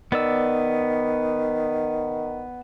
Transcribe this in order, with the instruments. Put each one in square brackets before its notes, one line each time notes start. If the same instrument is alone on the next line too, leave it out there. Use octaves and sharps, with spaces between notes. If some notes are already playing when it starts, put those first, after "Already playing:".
[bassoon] D#3 [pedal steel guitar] B3 D5 E6